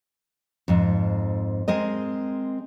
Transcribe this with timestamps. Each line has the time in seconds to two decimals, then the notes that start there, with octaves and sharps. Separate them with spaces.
0.68 F2 G#2
1.68 G#3 C4 A#4 D#5